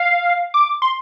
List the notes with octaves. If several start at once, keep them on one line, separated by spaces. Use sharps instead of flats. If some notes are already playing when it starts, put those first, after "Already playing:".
Already playing: F5
D6
C6